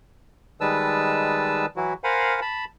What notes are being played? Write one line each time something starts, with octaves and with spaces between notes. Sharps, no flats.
D#3 G3 G#3 B4 A5 E6
E3 F#3 E4 F#4
A#4 C5 F5 F#5 G#5 B5
A5 B5